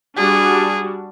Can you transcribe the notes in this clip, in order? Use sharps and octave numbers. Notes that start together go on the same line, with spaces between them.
G3 D4 F#4 G#4